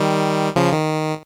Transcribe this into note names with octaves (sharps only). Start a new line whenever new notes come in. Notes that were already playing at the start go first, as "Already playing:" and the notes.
Already playing: D#3 G3
C#3 F3
D#3